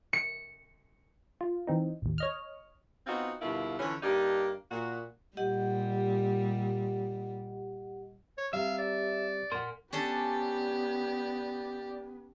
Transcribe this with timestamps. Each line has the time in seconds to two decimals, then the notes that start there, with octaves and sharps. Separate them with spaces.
0.13 C#7
1.41 F4
1.67 E3 C4 D#4
2.02 A1 D#2
2.18 C#5 D#5 F6
3.06 B3 C4 D#4 F4 F#4
3.41 G2 B2 D3 A#3 E4 F4
3.79 D3 E3 F3 C#4
4.03 G2 A#3 D4 D#4 G4
4.71 A#2 F#4
5.37 A#2 G3 G4 D#5 F#5
8.38 C#5
8.53 C3 G3 E5 F5
8.79 D5
9.52 A#2 A#4 F#5 C6
9.93 B3 C#4 D4 G4 A4 D5